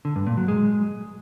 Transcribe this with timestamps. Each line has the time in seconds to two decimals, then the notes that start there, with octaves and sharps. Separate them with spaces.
0.05 D3
0.16 G2
0.27 A#2
0.37 F#3
0.48 G#3